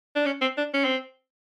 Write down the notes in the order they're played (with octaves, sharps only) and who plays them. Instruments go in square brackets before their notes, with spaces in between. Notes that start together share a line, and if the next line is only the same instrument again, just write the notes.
[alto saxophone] D4
C#4
C4
D4
C#4
C4